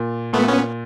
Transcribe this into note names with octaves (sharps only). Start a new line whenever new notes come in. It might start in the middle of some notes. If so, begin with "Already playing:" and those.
Already playing: A#2
A#2 A3 B3
B3 C#4